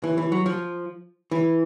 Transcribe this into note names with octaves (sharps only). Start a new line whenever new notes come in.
E3
E3
F#3
F3
E3